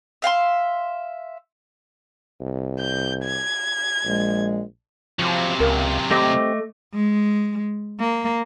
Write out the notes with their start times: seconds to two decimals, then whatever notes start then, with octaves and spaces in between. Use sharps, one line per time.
0.22 E5 F5 G5 C6
2.41 C2
2.80 G6
3.24 G#6
4.05 A#1 G#3
5.19 C3 F3 F#3
5.60 C#2 A#4 F5
6.11 A3 C4 G4 D#5 D6
6.94 G#3
7.99 A#3